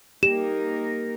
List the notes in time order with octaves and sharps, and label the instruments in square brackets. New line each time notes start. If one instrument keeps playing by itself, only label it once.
[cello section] A#3 D#4 A#4 [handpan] G4 [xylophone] E7